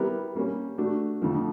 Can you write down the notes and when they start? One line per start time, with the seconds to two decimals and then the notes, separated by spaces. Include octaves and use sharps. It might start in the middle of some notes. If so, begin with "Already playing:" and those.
Already playing: G3 B3 E4 G4 A#4
0.35 G3 A#3 C#4
0.78 A3 D4 F#4
1.21 F2 D3 F3 A3